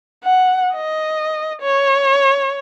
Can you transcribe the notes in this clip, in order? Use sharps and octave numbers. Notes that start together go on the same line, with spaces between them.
F#5
D#5
C#5